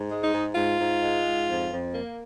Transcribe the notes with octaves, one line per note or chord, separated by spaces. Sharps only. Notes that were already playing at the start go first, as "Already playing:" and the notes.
Already playing: G#2
G#3
D#4
G#2
G#2 F4
G#2
G#3
G#2
F2
F2
A#3